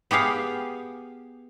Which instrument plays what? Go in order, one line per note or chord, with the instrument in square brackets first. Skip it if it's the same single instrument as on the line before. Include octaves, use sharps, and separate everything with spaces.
[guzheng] B3 G4 G#4 F5